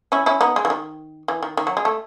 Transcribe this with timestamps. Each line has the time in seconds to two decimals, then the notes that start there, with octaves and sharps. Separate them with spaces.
0.12 C#4 E4
0.26 C#4 E4
0.41 B3 D#4
0.56 G#3
0.65 E3
0.70 D#3
1.28 E3
1.43 D#3
1.57 D#3
1.67 F#3
1.77 G#3
1.85 A3